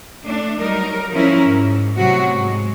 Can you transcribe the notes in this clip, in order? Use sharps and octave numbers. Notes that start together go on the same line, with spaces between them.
A3 D4
F#3 G3 D#4 A#4
F3 C#4 E4 A#4
G#2
A2 C3 F#3 F#4
G#2 G#3